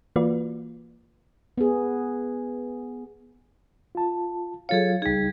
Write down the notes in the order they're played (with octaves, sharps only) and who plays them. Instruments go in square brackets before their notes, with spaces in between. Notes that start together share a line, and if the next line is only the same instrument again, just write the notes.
[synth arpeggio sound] E3 A#3 F4 F#4 B4 D5
[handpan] B3 G#4
[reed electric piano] F4 A5
[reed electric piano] F#3 F4 F5 [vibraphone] G#4 A4 C#5
[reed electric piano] C#2 D#4 [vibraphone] G3 G#4